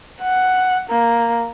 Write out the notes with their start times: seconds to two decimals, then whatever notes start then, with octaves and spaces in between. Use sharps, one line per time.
0.22 F#5
0.90 A#3